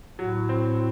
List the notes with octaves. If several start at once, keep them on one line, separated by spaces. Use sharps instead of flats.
A2 F#3
C4